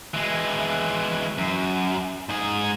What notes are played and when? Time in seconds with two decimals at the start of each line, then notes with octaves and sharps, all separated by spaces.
0.14 E3 G#3
1.38 F#2
2.29 G#2 G#4